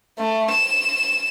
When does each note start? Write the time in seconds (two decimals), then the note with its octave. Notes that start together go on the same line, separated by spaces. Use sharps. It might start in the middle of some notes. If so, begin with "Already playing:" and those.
0.19 A3
0.51 E7